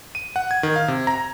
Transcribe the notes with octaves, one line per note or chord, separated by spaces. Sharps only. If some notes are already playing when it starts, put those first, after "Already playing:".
D#7
F#5
G#6
D#3
F5
C3
A#5